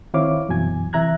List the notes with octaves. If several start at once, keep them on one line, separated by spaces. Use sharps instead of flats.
D#3 C4 E4 C#5 F5 D6
F#2 B2 E3 G#5 G#6
C3 E3 E5 A#5 F#6 G#6